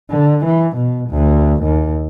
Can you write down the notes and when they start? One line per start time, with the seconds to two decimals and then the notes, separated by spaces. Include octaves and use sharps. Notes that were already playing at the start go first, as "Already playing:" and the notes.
0.11 D3
0.46 E3
0.77 B2
1.10 D2
1.63 D#2